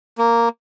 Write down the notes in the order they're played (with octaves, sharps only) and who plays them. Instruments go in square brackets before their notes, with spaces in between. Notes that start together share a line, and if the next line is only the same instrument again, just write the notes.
[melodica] A#3